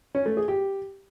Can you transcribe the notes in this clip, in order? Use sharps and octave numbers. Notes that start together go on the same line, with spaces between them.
C#4
A3
G#4
G4